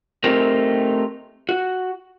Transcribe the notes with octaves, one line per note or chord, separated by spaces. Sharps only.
A3 C4 D#4 G4 A#4
F#4